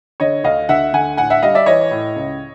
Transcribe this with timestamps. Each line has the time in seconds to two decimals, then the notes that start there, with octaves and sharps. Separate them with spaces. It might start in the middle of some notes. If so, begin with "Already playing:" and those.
0.20 D3 C#5 D#5
0.44 D2 D#5 F5
0.69 D2 E5 F#5
0.93 D3 F#5 G#5
1.17 A2 F#5 G#5
1.30 E5 F#5
1.43 G3 D#5 F5
1.55 D5 E5
1.66 E3 C#5 D#5
1.91 A2
2.16 C#2